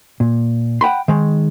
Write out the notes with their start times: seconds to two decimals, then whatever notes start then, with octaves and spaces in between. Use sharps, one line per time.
0.20 A#2
0.81 F#5 G5 B5 C6
1.08 D#3 G#3